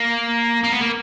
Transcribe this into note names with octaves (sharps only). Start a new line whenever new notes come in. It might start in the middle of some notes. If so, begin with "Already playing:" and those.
Already playing: A#3
A#3
B3
A#3